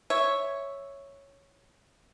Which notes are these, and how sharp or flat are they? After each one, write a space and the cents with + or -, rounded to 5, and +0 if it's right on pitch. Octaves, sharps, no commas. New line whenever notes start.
C#5 +0 E5 +0